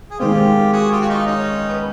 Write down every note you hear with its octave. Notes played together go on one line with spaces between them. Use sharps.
G#4
D#3 G#3 C4 F4 G4
F#4 G#4
F4 G4
F#4
D#4 F4
C#4 D#4
B3